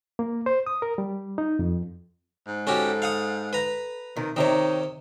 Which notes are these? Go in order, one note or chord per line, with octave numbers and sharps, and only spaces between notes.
A#3
C5
D#6
A#4
G3
D#4
F2
G#2
C#4 F#4 G4 A4
F5 F#5 D#6
B4 A#5
C3 D#3
C3 D#3 D#4 C#5 D#5